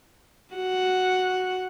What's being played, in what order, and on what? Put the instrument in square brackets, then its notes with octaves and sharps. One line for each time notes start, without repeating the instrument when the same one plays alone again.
[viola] F#4 F#5